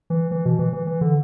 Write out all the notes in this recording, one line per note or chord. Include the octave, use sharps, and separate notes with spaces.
E3
E3
B2
E3
E3
E3
D3